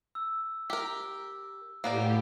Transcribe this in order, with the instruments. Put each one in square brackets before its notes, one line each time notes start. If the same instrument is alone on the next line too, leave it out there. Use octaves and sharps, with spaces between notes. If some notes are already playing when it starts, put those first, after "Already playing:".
[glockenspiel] E6
[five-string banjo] G4 A#4
[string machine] A2 G4 [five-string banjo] A#3 B3 D5